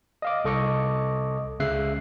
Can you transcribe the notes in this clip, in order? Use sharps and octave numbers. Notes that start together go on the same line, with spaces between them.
D#5 F5 D6
C2 A4 D#5 C#6 D6 C#7
C#2 C#3 E5 F#6 C7